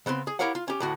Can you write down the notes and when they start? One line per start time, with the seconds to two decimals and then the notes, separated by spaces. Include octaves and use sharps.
0.06 C#3 B3 C4 C6
0.27 G#4
0.39 E4 G4 A#4 C#5 F5 F#5
0.55 F4
0.68 C#4 G4
0.80 D2 A2 F#4